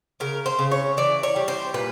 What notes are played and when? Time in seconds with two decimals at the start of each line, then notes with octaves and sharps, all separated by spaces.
0.20 C#3 A#4
0.46 C5
0.59 C#3
0.71 C#5
0.97 E3 D5
1.23 C#5
1.36 G3
1.48 C5
1.74 A#2 B4